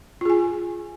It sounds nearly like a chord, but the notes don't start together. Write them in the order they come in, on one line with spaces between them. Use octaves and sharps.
F4 G#4 G#5